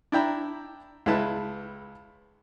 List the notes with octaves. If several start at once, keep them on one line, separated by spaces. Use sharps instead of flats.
D4 E4 G5 A#5
C#2 G#3 E4 B4 A5